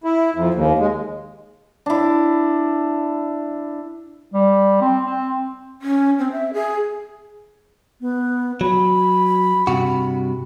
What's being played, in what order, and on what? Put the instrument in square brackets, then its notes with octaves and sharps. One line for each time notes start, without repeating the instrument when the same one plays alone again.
[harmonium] E4
F2
D#2
G#3
[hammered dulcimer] D4 E4
[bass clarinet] G3
C4
C4
[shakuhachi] C#4
C4
E5
G#4
[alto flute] B3
[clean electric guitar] F#3 [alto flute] B5
[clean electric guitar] G2 C3 F#4